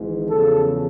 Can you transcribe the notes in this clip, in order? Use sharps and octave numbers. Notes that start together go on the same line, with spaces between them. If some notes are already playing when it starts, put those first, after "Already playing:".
Already playing: G#1 G#2 E3
E2 C#3 F3 A4